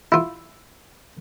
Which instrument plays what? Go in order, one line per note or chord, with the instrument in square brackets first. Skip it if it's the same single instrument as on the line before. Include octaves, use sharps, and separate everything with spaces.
[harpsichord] E4 F4